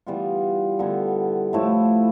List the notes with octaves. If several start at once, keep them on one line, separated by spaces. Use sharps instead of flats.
E3 G3 B3 F4
D3 G3 B3 E4
A2 F3 A3 E4